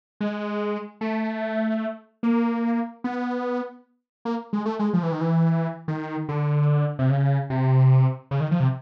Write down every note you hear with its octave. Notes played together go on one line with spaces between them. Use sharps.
G#3
A3
A#3
B3
A#3
G#3
A3
G#3
F3
E3
D#3
E3
D#3
D3
C3
C#3
C3
C#3
D#3
F3
C3